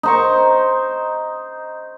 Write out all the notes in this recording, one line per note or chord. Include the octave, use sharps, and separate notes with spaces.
D#4 C5 C#6